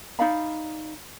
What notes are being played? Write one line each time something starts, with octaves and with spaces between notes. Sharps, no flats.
D#4 D5 F5 B5